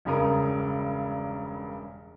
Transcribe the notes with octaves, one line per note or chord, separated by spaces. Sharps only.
E1 G2 C#3 A#4 D#6